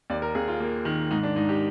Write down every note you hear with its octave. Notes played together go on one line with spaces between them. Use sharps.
D#2 D5
A#4
D#2 G#4
F4
A#3
D#3
G#2 D#4
D4
G#2 D#4
G4